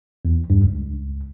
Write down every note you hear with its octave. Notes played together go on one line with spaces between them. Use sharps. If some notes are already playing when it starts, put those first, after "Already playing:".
E2
G2
C#2